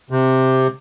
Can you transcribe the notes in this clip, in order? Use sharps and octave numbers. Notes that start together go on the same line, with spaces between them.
C3